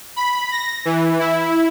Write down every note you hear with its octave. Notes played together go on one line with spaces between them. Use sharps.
B5
A#6
E3
E4